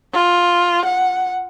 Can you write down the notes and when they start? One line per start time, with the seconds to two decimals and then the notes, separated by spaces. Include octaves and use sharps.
0.13 F4
0.85 F#5